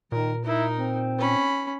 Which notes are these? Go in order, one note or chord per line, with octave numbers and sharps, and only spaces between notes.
A#2 D#3 A#4
D#4 E4 A#4
C4
C#4 B5